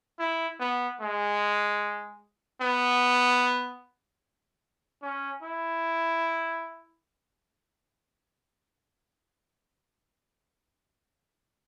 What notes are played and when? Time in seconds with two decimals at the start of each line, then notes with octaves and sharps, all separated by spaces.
0.19 E4
0.60 B3
1.01 G#3
2.62 B3
5.02 C#4
5.43 E4